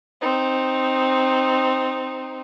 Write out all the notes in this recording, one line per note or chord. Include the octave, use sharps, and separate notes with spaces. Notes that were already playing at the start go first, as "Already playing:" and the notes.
C4 D#4